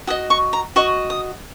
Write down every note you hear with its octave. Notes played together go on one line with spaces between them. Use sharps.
F#4 D#5 D#6
C#6
A#5
F#4 D#5 C#6
D#6